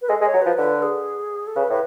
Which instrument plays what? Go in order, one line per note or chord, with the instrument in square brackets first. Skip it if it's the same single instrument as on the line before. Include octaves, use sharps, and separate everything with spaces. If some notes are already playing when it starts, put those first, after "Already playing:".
[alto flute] B4
[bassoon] G#3 [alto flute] A4
[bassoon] G#3
[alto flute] C#5
[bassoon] F#3
[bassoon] F3 [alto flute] B4
[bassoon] D3 [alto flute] B4
[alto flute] G#4
A4
[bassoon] C#3 [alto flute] B4
[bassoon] A2 [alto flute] B4